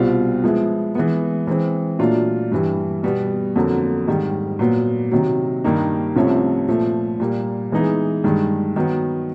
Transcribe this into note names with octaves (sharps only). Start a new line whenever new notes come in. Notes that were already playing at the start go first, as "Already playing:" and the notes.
Already playing: C2 B2 G3 C4 F4
F3 G#3 B3 E4
E3 G#3 B3
E3 G#3 C4
A#2 F#3 A3 D4 F4
G2 E3 G3
B2 G3 B3
F2 D3 F#3 A#3
G#2 D#3 G3
A#2 F#3 B3
C3 D#3 F#3
G2 D#3 G3 A#3 D#4
C2 C3 F3 A3 C#4
A#2 F3 A3
A#2 G3 A#3
E3 G#3 B3 D#4 G#4
G2 D#3 G#3
D#3 F#3 B3